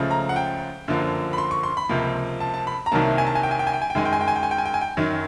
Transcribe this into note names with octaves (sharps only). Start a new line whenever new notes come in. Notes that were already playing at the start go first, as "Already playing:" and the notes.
Already playing: C#2 C#3 F3 A3
A#5
F#5
G5
F#2 D3 F3 A#3
B5
C6
C#6
C6
B5
C#2 C3 F3 A#3
A5
A5
B5
A#5
C2 C3 D#3 F#3 A#3 A5
G#5
A5
G#5
G5
G#5
G5
G#5
G5
G#5
G5
F#2 D#3 G#3 G#5
G5
G#5
G5
G#5
G5
G#5
G5
G#5
G5
G#5
G5
F#2 D#3 F#3